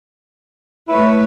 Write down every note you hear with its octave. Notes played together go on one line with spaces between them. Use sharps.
A3 E4 B4 C#5